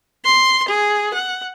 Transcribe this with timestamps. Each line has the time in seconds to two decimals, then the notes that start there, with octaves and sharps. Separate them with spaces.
0.25 C6
0.68 G#4
1.14 F#5